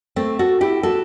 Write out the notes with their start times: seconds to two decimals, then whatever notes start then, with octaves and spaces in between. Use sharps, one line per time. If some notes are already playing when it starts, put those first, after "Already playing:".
0.16 A3 C4
0.39 F#4 A4
0.61 E4 G4
0.83 F#4 A4